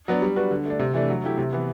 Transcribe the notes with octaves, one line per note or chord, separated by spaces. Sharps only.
F#3 B3 D4
G3
D4 F#4 B4
D3
A3 D4
C3
E3 A3 D4
F#3
A3 E4 G4
C3
E3 B3